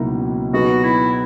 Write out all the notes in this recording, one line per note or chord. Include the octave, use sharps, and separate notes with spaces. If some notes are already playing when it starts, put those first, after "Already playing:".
Already playing: C#2 B2 F#3 A#3 D#4 E4
B2 F#3 B3 D#4 F#4 G#4
E4